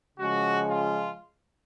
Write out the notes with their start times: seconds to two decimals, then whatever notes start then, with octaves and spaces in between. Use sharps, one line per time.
0.18 C#3 F3 G#3 F#4
0.65 F4